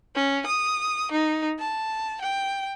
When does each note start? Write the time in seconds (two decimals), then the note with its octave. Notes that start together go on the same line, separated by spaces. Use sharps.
0.15 C#4
0.46 D#6
1.11 D#4
1.59 A5
2.21 G5